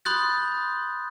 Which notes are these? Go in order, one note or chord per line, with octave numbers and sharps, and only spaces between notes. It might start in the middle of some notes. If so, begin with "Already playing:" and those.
B5 C6 D#6 F#6 G6 A6